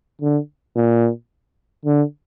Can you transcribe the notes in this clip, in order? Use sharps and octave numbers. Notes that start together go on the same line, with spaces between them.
D3
A#2
D3